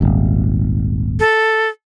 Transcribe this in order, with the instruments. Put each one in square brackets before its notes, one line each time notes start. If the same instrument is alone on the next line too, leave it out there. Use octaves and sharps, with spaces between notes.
[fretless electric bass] D#1 G#1
[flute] A4